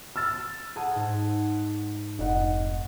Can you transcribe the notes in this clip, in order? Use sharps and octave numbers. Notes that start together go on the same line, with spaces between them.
E6 F6 A6
G#4 F#5 A5
G#2
F1 C4 D#4 D#5 F#5